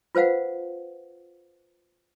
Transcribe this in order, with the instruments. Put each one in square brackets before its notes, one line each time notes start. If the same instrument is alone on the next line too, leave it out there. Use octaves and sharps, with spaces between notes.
[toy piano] F4 B4 C5 F5 F#5